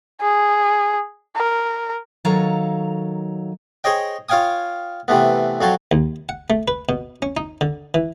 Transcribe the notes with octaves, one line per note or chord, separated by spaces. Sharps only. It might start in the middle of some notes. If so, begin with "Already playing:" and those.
G#4
A#4
D#3 F#3 A4 C#5 F5 A#5
G#4 C5 C#5 D#5 G5
F4 C#5 F5 G5 G#5 D#6
C3 E3 A3 B3
F2 F#3 C#5 A5 C6
D#2
F#5
A3
B4
B2
C#4
D#4
D3
E3